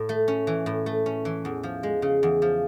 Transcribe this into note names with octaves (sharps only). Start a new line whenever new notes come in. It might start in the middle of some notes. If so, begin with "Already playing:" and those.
Already playing: A2
A3
C#4
E3
A2
A3
C#4
E3
E2
F3
G#3
C#3
E2
F3